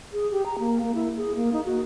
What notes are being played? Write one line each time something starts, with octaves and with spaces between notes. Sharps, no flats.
G#4
G4
A#5
A#3
A#3
E4
G#4
A#3
D#4
F#4